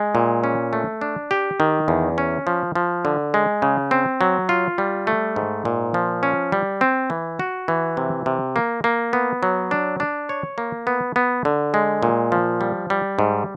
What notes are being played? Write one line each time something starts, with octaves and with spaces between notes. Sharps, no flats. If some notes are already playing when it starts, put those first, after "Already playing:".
Already playing: G#3
A#2
C#4
A3
D4
G4
D#3
E2
C#4
F3
F3
D3
G#3
C#3
C4
F#3
F4
G3
A3
G#2
A#2
F3
C#4
G3
C4
E3
F#4
E3
C3
C3
A#3
A#3
B3
F#3
D4
D4
C#5
A#3
B3
B3
D3
G#3
A#2
F3
G3
G3
G#2